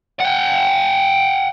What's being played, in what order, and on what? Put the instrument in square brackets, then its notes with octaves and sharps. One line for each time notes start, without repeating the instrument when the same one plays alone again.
[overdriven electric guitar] F#5 G5